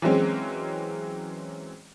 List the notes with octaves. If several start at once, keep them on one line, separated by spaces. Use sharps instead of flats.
E3 F#3 G#3 C4 C#4